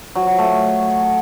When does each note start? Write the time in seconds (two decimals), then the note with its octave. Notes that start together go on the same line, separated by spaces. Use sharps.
0.15 F#3
0.27 F#3
0.38 A3